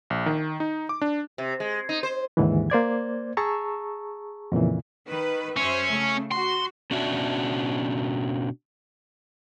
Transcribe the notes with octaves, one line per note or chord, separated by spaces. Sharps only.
A#1
D#3
D#4
D6
D4
C3
G#3
D#4
C5
D#2 G#2 D3 E3
A#3 C5 D5 G#6
G#4 A5 A#5 C#6 E6
F2 A#2 C#3 E3
D#3 B4
F#2 C#4 C5 E5
C#3 A3
F#4 C6
B2 C#4 D4 F#4 E5